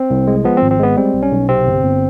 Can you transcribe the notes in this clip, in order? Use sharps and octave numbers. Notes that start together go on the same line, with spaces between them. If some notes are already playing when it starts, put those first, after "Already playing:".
Already playing: C4
C2
G#3
F3 B3
C4
G#1
C4
G#3 B3
G3 C4
B1
C#4
B1
C3 C4
G1
G1